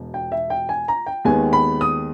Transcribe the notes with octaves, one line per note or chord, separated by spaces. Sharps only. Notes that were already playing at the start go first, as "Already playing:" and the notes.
Already playing: E1 B2
G5
E5
G5
G#5
A#5
G5
D#2 D#3 G#3 B3 G#5
B5
D#6